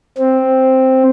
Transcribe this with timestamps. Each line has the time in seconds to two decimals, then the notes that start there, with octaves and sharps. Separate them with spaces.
0.18 C4